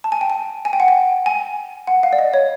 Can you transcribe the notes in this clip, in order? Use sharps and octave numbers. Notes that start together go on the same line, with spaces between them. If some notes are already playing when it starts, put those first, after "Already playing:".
A5
G#5
G5
G#5
G#5
G5
F#5
G5
G#5
F#5
F5
D5
D#5
C#5